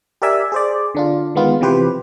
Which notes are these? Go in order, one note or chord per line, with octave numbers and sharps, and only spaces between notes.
G4 A#4 D5 E5 G#5
G#4 C5 D5
D3 D4 F4
D#3 G#3 B3 F4
C3 E3 F3 G4 B4 C5